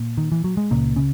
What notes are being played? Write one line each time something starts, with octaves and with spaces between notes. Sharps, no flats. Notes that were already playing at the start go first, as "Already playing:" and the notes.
Already playing: A#2 A#3
D#3
E3
F#3
G#3
C#2 A#2 C#3 A#3
C#3 C#4